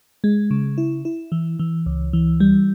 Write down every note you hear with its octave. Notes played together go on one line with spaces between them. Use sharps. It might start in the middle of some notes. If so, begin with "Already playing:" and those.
G#3
C#3
E4
E4
E3
E3
C#2
E3
G3